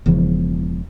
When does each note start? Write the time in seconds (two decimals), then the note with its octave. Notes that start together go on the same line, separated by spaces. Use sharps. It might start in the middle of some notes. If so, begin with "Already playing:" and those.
0.06 E1 E2 C#3 F3